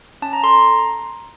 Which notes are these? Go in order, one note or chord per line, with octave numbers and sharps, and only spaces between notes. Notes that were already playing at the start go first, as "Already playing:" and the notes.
C#4 A5
A#5
A4 C6
A#5